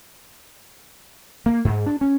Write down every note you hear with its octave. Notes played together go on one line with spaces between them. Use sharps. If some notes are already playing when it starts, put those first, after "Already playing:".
A#3
G#2
D4
C#4